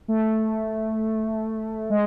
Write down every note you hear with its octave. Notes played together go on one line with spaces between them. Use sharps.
A3
G#3